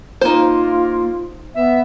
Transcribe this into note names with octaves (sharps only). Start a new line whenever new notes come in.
A#3 D#4 F4 C5
B3 E5